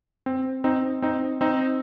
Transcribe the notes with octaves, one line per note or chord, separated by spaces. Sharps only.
C4
C4 D#4
C4 D#4
C4 D#4